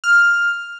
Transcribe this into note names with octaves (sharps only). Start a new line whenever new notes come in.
F6